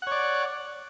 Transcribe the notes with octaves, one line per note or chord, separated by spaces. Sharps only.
C#5 D5 F#5